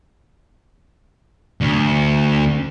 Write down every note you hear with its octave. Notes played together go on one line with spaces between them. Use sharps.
D2